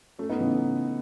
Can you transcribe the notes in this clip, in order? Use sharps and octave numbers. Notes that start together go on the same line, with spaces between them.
A3 C#4
B3 D#4
C#3 E3